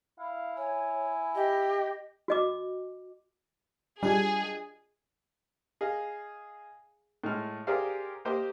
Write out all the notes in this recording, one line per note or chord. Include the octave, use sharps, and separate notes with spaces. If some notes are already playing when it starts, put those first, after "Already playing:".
E4 F5
C#5 G#5
G4 D#5
F#4 D#5 D6
G3 D4 F4 G4 G#4 D#5
G#4 D#5 F5
A2 G#3 A3 F6
G4 G#4 A#4 C5 D5 F5
A#3 G4 C5 D#5